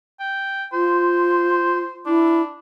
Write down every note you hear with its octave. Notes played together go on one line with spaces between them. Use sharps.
G5
F4 C5
D4 E4